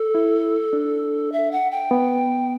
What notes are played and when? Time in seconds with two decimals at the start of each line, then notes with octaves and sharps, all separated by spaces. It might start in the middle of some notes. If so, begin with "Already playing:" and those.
Already playing: A4
0.15 E4
0.73 D4
1.32 E5
1.52 F#5
1.71 G5
1.91 B3